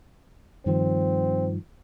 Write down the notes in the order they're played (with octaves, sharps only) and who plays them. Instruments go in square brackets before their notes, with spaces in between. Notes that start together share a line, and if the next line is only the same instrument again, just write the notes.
[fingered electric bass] G2 D#3 F3 [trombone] C4